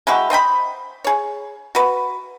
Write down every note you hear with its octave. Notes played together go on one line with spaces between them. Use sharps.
G#3 E4 F#4 G4
C5 D#5 G5 B5
G#4 C#5
F#4 B4